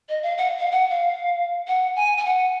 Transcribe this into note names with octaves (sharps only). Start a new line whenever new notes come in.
D#5
F5
F#5
F5
F#5
F5
F#5
G#5
G#5
F#5